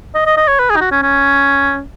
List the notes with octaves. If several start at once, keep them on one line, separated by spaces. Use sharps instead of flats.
D#5
D#5
D#5
C#5
B4
G#4
D#4
F#4
C#4
C#4